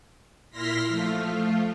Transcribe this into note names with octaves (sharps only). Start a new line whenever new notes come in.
A#2 E4 C6 F6 A#6 B6
F3 A3 F4